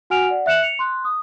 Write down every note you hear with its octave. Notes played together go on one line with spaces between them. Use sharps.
F#4 F#5 G#5 F6 D7 F7
D5 F#5
E5 F#6 C#7 E7 F#7
C#7 F7
C6 F#6
D#6